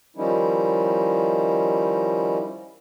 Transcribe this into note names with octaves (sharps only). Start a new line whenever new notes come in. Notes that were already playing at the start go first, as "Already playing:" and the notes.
D#3 F3 G3 C#4 D#4 E4